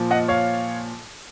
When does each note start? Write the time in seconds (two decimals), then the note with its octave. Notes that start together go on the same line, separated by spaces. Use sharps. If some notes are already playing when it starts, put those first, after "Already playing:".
Already playing: A#2 F3
0.11 D#5 F#5
0.28 C#5 F5